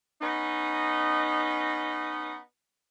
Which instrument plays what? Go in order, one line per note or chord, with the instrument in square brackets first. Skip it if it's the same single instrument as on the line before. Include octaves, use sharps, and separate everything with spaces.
[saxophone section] B3 C#4 D#4